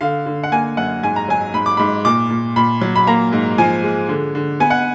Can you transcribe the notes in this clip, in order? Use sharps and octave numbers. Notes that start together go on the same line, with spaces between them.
D3 F5
D3
F#5
A#3 G#5
F#2 F#5
G#2 G#5
A#5
F#3 G#5
G#2 B5
D6
G#2 B5
A#2 D6
A#2
A#2 B5
F#3
B5
A#3 A#5
G#2
F3 G#5
G#3
D3
D3
B3 G#5
F#5